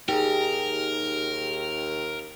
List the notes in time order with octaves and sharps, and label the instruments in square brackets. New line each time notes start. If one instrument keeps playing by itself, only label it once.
[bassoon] D#2 [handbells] D#4 G#4 [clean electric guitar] G4 [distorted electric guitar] A#4